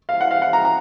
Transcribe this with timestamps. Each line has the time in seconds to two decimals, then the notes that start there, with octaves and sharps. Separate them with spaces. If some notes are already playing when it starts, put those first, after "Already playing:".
0.09 F5
0.21 F#5
0.31 F5
0.42 F#5
0.53 A#5
0.65 A#5